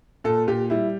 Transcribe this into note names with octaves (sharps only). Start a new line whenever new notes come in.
A#2 A4
A#2 G4
G3 E4